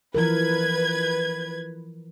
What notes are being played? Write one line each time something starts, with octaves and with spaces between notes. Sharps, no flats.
E3 F3 A#4 B4 G#6